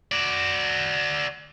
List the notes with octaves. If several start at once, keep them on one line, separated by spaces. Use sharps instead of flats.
F#4 D5